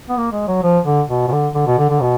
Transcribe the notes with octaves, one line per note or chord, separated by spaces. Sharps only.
B3
A#3
G#3
F#3
F3
D3
B2
B2
D3
D3
B2
D3
D3
B2